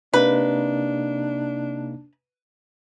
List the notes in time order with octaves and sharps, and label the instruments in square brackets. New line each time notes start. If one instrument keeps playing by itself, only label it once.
[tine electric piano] C3 A#3 D#4 [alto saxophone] D4 [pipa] B4